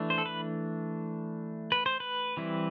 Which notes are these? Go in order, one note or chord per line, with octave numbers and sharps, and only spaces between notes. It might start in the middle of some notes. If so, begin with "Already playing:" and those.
Already playing: E3 A3 D4
C5
A4
B4
B4
C5
B4
E3 G3 C4 E4